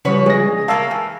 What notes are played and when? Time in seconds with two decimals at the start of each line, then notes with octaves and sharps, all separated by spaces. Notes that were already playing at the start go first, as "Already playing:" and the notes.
0.05 C#3 F3 G3 F#4 B4 C#5
0.26 A#2 G#3 A#6
0.68 C#3 A#3 F5 A5 E6
0.91 E3